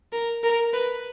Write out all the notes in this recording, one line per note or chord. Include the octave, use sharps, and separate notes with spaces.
A#4
A#4
B4